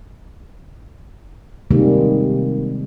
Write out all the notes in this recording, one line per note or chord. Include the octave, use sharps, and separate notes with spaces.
C3 D#3 G3 G#3 A#3